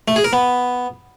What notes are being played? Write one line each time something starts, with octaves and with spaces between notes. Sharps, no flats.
A3
G#4
A#4
B3